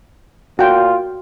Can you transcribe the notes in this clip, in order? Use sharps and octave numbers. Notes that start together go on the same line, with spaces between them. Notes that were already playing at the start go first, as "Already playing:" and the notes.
A#2 F4 F#4 G5